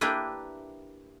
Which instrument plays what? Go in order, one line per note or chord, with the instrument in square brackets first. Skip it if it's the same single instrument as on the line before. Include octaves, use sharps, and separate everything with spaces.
[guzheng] A#3 D4 E4 G4 B4